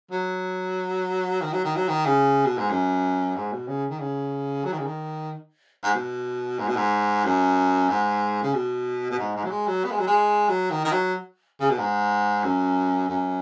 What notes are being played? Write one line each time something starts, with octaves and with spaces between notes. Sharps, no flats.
F#3
D#3
F#3
D#3
F#3
D#3
C#3
B2
G#2
F#2
G#2
B2
C#3
D#3
C#3
F#3
D#3
C#3
D#3
G#2
B2
G#2
B2
G#2
F#2
G#2
C#3
B2
B2
G#2
G#2
F#3
G#3
F#3
B3
G#3
F#3
G#3
F#3
D#3
D#3
F#3
C#3
B2
G#2
F#2
F#2